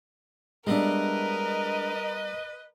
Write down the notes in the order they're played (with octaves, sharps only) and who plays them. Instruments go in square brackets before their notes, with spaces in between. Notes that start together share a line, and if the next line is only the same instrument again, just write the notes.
[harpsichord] G3 B3 E4 [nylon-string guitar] G#3 D4 [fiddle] A#4 [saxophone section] B4 D#5